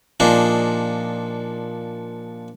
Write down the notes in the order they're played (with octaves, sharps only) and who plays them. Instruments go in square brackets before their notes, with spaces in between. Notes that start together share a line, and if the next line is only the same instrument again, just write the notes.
[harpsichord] A#2 F3 D4 D#4 G#4